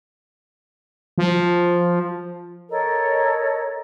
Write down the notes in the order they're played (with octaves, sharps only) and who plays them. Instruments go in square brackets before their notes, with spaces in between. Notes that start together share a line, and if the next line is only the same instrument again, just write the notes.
[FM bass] F3
[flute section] A4 A#4 C#5 D#5